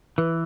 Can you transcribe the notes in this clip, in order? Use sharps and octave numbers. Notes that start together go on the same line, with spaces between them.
E3 B4